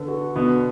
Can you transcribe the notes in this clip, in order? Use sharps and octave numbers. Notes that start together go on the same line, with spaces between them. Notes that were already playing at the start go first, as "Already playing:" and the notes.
Already playing: D3 B3 A4
F#4
B2 D3 B3